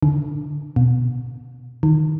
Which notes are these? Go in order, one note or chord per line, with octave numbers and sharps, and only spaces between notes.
D3
B2
D#3